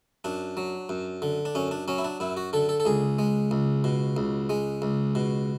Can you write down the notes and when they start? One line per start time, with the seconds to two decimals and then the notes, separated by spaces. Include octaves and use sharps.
0.24 F#2 D4
0.57 F#3
0.89 F#2
1.22 D3
1.45 D4
1.55 F#2 C#4
1.71 D4
1.88 F#3 C#4
1.98 E4
2.04 D4
2.20 F#2 E4
2.37 F#4
2.53 D3 A4
2.69 A4
2.80 A4
2.85 C#2 G#4
3.19 G#3
3.51 C#2
3.84 B2
4.17 C#2
4.50 G#3
4.82 C#2
5.15 B2